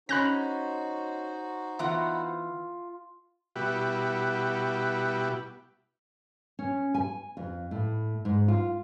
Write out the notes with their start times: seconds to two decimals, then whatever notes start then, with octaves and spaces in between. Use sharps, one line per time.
0.09 C#4 D#4 F#4 C5 B5 F#6 A#6
1.79 E3 B3 F4 F#5
3.56 B2 G3 E4 F#4 G4 B5
6.59 C#4
6.94 G#5
7.37 F2
7.71 A2
8.25 G#2
8.48 F4